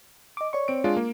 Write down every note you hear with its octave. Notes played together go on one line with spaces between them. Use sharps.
D#5 D6
C#5 D5 C#6
C4 D7
G#3 D4 F4
A#3